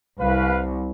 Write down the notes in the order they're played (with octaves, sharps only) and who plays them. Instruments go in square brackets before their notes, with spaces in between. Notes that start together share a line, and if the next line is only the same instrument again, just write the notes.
[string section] C2 [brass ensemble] B4 F5